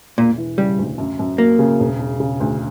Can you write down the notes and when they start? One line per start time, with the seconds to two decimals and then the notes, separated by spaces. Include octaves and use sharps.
0.18 E1 A#2
0.38 E3
0.58 C#3 G3
0.79 D2
0.98 F#2
1.19 F#2
1.38 F#3 A#3
1.59 C#3
1.79 E1
1.99 E1
2.20 C#3
2.40 D2